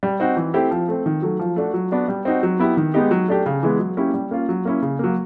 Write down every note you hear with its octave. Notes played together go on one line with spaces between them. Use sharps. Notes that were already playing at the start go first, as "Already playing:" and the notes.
G3
C4 D#4 F#4
E3
A3 C4 E4 G4
F3
A3 C4
D#3
F#3 A3
F3
A3 D4 F#4
F#3
B3 D4 F#4
G3
C4 D#4 F#4
F#3
B3 E4 G4
D#3
G#3 B3 D#4 G4
F#3
A3 D4 G4
C#3
E3 G#3 B3
F#3
A#3 C#4 E4 G4
G3
A#3 C#4 F4
F#3
A#3 C#4 E4
C#3
F#3 A#3